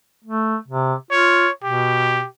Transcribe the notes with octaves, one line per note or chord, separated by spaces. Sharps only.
A3
C3
F4 C#5
B2 G4